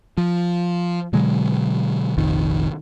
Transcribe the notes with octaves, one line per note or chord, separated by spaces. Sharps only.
F3
B2 D3 F#3 G#3
F1 A#1 F2 D#3